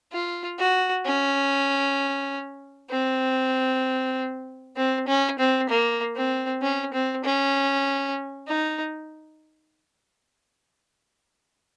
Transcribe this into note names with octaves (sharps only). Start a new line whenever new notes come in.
F4
F#4
C#4
C4
C4
C#4
C4
A#3
C4
C#4
C4
C#4
D#4